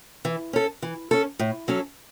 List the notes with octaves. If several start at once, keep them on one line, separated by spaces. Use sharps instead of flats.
E3
C#4 A4
E3
C#4 A4
A2
F#3 C#4 A4